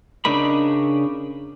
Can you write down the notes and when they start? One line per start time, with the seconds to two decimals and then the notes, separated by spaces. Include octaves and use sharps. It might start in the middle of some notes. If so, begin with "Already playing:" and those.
0.25 C#3 D4 D#4 A#4 B5